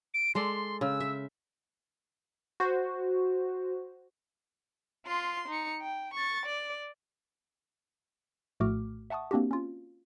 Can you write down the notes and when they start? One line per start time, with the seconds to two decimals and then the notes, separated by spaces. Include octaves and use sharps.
0.14 D7
0.35 G#3 A4 D5 C6
0.81 C#3 E6
1.00 E5
2.60 F#4 C5
5.06 F4 C6
5.48 D#4 C#7
5.82 G5
6.14 C#6 A6
6.46 D5
8.60 A#1 A2 A3 F#4 D6 F6
9.10 E5 F#5 A5 C#6 D#6
9.31 A#3 C4 D4 F#4 G4
9.51 C#4 F4